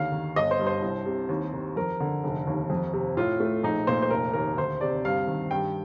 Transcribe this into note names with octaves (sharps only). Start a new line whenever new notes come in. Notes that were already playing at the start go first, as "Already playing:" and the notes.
Already playing: D#2 D3 F5
D#3
G1 D#5
C5
G2
C5
C2
C3
D#2
D#3
F2 A#4
D3
F1
D#2
F2
C3
A2 F4
A3
A#1 D#4
A#2 C5
C5
F1 A#4
D#2 A#4
D2 C5
C3 D5
G2 F5
D#3
G2 G5